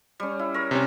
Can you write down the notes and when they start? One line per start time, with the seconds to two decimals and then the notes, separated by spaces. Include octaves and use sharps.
0.20 G3 C#4
0.39 E4
0.54 A#4 C#5
0.71 C3 C#4